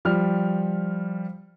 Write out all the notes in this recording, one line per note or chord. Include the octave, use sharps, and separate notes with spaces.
F3 G3 F6